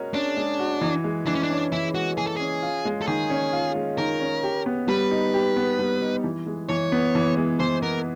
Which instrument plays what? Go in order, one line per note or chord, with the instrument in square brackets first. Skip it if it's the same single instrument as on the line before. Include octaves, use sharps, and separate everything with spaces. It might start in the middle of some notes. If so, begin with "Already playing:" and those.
Already playing: [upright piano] G#3 C#4 F#4 A#4
[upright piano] C#4 [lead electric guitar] D4
[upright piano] G#3
F#4
E3
G#3
[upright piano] E3 [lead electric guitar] D4
[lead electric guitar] C#4
D4
[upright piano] C#4
[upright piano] E3 [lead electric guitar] E4
[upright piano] G#3 [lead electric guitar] F#4
[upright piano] E3 [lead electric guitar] G#4
[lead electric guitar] A4
[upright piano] C#4 [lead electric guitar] G#4
[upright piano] F4
G#3
[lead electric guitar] A4
[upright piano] D#3 [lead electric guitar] G#4
[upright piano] C#4
F4
G#3
[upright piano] D#3 [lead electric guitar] A#4
[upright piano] C#4
G4
B3
[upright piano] G3 [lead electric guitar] B4
[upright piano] D#4
G4
B3
G3
D#4
E3
G#3
[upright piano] E3 [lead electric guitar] C#5
[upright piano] B3
E3
G#3
[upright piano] E3 [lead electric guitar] C5
[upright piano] B3 [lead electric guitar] A#4